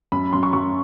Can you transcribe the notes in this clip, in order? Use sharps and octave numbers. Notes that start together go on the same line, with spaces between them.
F#2 B5
F#2 C6
C#6
F#2 C#6